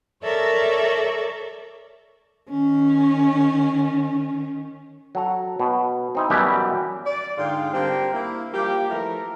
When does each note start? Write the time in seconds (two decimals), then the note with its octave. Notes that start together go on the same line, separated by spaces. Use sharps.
0.23 A4 A#4 C#5 D5 E5
2.50 D#3 C#4
5.15 F#3 A4 A#5
5.60 B2
6.15 C4 D#4 E4
6.30 F#2 B2 E3 G3 G4 E5
7.05 D5
7.38 G#2 D3 F4 G#4 F5 G5
7.73 D3 G3 C4 G4 A#4 G5
8.12 A#3 E4
8.53 F3 G3 A#3 G4
8.89 E3 F3 A3 A4 A#4